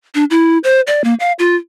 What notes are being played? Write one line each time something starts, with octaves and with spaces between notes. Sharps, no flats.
D4
E4
C5
D5
A#3
F5
F4